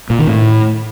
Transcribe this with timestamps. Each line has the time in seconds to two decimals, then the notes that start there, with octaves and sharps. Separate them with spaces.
0.10 A#2
0.19 D#3
0.27 A2